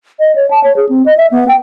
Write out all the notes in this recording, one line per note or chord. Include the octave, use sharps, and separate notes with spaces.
D#5
C#5
A5
C#5
G#4
C4
D#5
E5
B3
G5